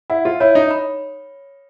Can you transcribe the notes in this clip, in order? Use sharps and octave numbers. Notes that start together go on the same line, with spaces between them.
E4 F#5
F4
E4 C#5
D#4
B5